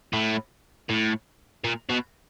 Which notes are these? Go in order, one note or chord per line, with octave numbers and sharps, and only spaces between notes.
A2
A2
A#2
B2